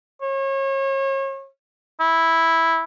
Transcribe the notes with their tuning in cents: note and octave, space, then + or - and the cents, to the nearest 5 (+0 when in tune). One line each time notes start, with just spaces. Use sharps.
C#5 -35
E4 -5